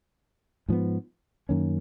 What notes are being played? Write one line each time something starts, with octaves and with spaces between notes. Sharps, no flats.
G#2 F3 B3
F#2 D#3 A#3 C#4